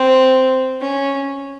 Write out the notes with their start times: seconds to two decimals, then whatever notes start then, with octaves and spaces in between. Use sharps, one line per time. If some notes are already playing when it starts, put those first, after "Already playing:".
Already playing: C4
0.81 C#4